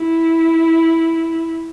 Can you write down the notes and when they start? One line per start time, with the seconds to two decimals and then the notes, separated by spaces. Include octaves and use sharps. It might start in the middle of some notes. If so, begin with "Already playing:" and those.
Already playing: E4